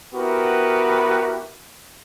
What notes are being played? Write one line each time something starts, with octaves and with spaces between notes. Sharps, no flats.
B3 E4 F#4 G4 A#4 B4